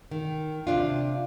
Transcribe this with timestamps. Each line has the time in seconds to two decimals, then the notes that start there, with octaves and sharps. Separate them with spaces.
0.11 D#3
0.67 C3 D4 F4